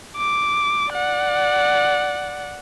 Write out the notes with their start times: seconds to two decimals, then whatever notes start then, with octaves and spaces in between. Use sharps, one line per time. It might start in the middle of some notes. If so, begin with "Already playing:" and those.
0.17 D6
0.91 D5 F#5